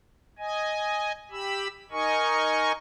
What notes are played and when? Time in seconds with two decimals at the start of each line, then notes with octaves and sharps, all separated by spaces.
0.38 D#5 G#5
1.31 G4 B5 E6
1.91 D#4 A#4 D#5 G#5 C#6